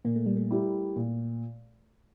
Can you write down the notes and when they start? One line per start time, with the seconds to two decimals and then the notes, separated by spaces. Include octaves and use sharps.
0.04 A#2 A#3
0.16 A3
0.26 G3
0.36 A3
0.50 G3 A#3 E4 G4
0.96 A#2